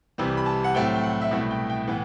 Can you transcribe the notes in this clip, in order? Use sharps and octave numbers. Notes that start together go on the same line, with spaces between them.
C2 C3 E3 G3
B5
A5
F#5
A2 F#3 A3 C4 G5
G5
F#5
E5
C2 B2 A3 E4 F#5
G5
G5
A2 E3 B3